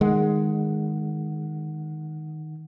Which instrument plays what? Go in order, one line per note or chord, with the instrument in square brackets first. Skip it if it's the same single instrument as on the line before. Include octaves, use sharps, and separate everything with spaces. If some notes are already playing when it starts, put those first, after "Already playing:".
[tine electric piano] D#3 F#5 [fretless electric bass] G#3